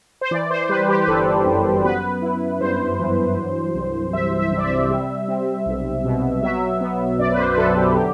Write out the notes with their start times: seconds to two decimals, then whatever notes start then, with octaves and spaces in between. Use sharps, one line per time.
0.21 C5
0.31 E3 D5
0.50 C5
0.69 G3 B4
0.88 G4
1.03 B4
1.07 G1 A4
1.46 F#2
1.84 B3 B4
2.22 E4
2.61 G2 C5
2.99 E3
3.37 F#3
3.75 C2
4.13 C2 E5
4.39 E5
4.52 C3
4.58 D5
4.64 E5
4.90 G3
5.28 C4
5.66 B1
6.04 B2
6.42 F#3 E5
6.81 B3
7.19 F#2 D5
7.32 B4
7.38 C5
7.53 B4
7.57 D3 A4
7.76 G4
7.95 F#3 G4